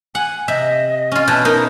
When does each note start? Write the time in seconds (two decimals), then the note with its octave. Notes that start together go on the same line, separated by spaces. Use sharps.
0.15 F#5 G#5
0.48 C3 D#5 E5
1.12 C#4 F4
1.28 B2 E4 A5
1.45 B3 D#4 A#4